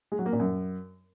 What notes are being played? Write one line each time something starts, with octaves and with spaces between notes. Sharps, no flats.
G#3
F#3
A#3
A#2
F#2